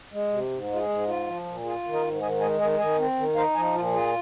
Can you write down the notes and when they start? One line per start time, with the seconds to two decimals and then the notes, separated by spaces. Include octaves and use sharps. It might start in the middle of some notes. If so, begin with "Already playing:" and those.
0.12 G#3
0.31 C3
0.51 G#2
0.69 G#3 F4
0.79 G#4
0.89 G#2
1.08 F4
1.26 F3
1.46 A#2
1.65 F4 G#4
1.84 D#3
1.93 A#4 D#5
2.03 G#2
2.21 D#3 D#5 G#5
2.41 G#3 D#5 G#5
2.60 D#3 D#5 G#5
2.79 D#3 D#5 G#5
2.98 C4
3.18 D#3
3.36 D#4 C5 F5
3.55 F3 D#5 G#5
3.75 A#2 F4
3.93 F4 G#4